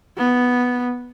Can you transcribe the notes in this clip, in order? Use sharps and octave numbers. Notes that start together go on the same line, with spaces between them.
B3